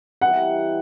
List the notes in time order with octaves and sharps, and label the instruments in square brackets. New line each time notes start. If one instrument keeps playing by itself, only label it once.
[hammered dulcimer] E3 G3 C4 D#4 [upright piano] F#5